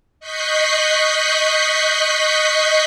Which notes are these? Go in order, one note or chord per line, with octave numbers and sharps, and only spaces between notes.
D#5 C#6 F#6 G6 B6 C7